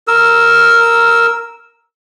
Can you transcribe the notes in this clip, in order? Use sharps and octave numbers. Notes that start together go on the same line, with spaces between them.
A#4 E6